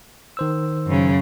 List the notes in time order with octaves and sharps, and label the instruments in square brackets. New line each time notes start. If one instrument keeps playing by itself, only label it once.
[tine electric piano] D#3 C5 E6
[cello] F#2 C#3